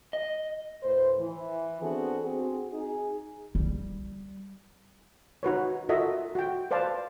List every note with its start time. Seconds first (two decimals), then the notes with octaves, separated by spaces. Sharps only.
0.13 D#5
0.83 D2 A2 B4 C5
1.19 E3
1.82 B3 C4 D4 F#4 G#4 A4
2.22 C4 F#4 G#4
2.72 D#4 G#4
3.55 G3
5.43 D#4 F#4 B4 C#5
5.89 F4 F#4 A4 A#4 D#5 E5
6.35 F#4 G5
6.71 B4 C5 D5 F5 A5